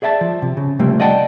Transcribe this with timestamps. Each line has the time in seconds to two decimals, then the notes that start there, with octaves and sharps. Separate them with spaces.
0.02 G#4 D5 E5 G5 A5
0.21 F3
0.42 C3
0.57 C#3
0.79 C3 F3 G3 A3 A#3
1.00 D5 D#5 F#5 G5 A5